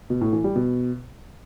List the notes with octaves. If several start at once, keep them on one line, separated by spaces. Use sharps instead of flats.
B2
A2
E3
G3
B2